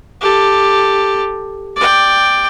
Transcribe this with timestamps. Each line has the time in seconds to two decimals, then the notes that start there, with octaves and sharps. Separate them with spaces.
0.21 G4 A4
1.76 D5 G5